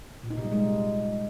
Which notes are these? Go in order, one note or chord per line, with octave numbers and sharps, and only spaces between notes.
A#2
D#4
C3
G3
G#3